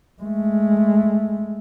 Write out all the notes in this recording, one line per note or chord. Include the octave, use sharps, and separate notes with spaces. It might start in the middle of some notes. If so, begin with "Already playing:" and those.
G#3 A3